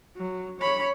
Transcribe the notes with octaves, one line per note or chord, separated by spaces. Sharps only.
F#3
C#5 B5